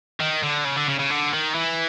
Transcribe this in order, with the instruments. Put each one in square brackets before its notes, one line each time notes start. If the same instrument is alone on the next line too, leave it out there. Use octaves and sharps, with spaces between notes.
[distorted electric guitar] D#3
D3
C#3
D3
C#3
C#3
D3
D#3
E3